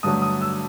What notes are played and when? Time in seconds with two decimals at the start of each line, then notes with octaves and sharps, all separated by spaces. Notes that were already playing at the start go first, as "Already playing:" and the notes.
0.03 G2 D3 F#3 A3 D#6
0.22 D#6
0.41 E6